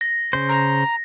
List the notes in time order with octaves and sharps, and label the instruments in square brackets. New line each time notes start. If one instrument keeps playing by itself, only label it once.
[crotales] A#6
[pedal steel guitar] C#3 C5
[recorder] A#5